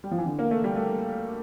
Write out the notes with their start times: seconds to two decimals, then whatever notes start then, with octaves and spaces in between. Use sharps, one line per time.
0.04 G3
0.11 F3
0.18 E3
0.25 D3
0.39 A#3
0.51 A3
0.64 G3
0.76 A3